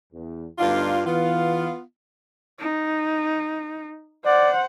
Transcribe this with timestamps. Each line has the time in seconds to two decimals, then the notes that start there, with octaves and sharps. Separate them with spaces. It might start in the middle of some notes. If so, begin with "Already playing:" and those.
0.13 E2
0.59 G1 D2 G2 D4 D#4 F4
1.06 E2 E3 B3 F4 F5
2.59 D#4
4.25 C5 D5 F#5